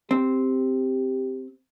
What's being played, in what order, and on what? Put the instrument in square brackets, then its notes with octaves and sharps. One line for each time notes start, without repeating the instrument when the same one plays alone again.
[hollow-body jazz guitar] C4 [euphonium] G4